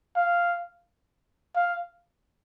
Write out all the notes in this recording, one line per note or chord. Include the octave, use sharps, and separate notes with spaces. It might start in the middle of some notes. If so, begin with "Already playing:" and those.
F5
F5